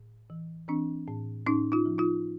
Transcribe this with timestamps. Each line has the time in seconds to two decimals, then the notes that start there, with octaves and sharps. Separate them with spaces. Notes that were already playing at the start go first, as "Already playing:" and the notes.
Already playing: A2
0.30 E3
0.68 E3 C4 D4
1.08 A2
1.47 A2 C#4 D#4
1.72 D#4 F4
1.86 F3
1.98 D#4 F4